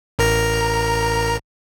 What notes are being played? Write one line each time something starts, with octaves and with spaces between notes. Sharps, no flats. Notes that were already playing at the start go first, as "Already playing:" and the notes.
A1 A#4 A#5